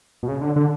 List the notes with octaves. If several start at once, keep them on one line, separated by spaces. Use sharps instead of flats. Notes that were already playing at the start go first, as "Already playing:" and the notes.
B2
C#3
D3
D3